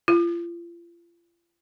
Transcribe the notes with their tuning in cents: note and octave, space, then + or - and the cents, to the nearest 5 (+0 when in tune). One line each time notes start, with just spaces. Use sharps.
F4 -35